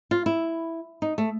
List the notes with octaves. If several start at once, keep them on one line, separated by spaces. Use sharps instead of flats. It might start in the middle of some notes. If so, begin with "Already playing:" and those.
F4
E4
D#4
A3